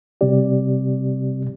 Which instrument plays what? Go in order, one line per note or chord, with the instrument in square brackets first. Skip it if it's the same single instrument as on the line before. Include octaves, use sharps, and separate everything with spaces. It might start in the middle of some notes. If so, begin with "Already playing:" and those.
[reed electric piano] C3 G3 C4 G4 D5